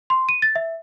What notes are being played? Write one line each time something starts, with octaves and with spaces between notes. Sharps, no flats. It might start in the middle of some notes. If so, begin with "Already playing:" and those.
C6
D#7
A6
E5